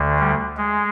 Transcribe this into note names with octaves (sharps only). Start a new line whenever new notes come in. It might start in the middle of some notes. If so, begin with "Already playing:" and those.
Already playing: D2 D3
G3
G#3